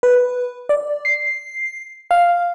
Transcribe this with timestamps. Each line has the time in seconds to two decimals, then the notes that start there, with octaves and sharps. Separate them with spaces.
0.03 B4
0.69 D5
1.05 C7
2.11 F5